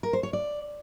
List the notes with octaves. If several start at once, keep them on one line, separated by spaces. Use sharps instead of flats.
A#4
C5
C#5
D5